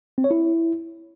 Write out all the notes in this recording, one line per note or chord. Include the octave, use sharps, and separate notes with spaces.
C4
C#5
E4